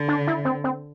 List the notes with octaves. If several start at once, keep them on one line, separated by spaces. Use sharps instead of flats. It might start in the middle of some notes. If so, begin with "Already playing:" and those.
Already playing: D3
D4
E4
C4
C4